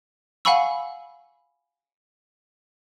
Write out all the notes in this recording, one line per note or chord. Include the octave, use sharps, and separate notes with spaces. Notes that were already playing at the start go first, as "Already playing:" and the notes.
F5 F#5 G#5 B5 C#6 E6